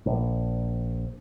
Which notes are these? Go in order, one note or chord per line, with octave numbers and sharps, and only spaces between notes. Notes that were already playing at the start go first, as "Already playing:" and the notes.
A#1